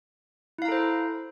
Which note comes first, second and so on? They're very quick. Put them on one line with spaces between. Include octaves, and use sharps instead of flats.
E4 F5 A#5 A4 C5